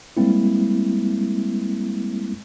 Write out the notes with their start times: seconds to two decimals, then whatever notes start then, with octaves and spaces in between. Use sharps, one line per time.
0.17 G3 G#3 A#3 C4 E4